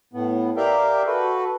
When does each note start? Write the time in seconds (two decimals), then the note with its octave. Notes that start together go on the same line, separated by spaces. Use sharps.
0.13 A2 B3
0.57 G4 A#4 D5 E5 F5 G5
1.06 F#4 A4 B4